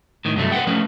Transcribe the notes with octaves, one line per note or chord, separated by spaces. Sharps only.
A2 D#3
G2 C3 F#3 A3
B4 C5 F#5 G5
F3 A3 C#4 B4